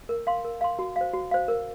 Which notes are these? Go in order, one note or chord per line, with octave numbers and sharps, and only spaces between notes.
A#4
F5 C6
A#4
F5 C6
F#4
C5 F5
F#4
C5 F5
A#4